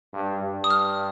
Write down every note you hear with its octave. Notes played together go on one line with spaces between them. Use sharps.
G2
G2
D#6
F6